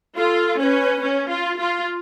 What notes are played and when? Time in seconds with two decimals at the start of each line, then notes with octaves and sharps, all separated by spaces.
0.17 F4 A4
0.59 C#4 C#5
0.63 B4
1.02 C#4
1.30 F4
1.58 F4